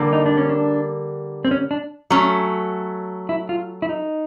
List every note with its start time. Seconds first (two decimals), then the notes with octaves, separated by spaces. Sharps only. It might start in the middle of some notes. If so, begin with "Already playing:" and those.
Already playing: D3 G3 A#3
0.13 D#4
0.26 D4
0.37 C#4
0.49 D4
1.45 C4
1.51 C#4
1.71 D4
2.10 F#3 A3 C#4
3.29 E4
3.49 F4
3.82 E4
3.89 D#4